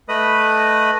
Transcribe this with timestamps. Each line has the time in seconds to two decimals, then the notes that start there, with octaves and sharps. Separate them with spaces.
0.09 A3 B4 D#5 B5 D#6